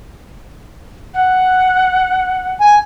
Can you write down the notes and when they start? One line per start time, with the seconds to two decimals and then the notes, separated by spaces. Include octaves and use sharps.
1.14 F#5
2.61 G#5